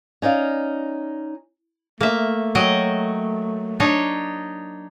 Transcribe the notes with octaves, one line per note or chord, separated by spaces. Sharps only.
C#4 D#4 D5 F5
A3 A#3 E5
F#3 D#5 G5
D4 D#4 C#5